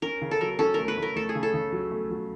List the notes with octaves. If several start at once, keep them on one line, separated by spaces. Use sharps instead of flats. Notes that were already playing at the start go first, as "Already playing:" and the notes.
C#4 A#4
C#3
A4
F#3 A#4
C#4 A4
A3 A#4
B4
A3
A#4
A3 A4
G#4
C#3
A4
C#3
F#3
A3
F#3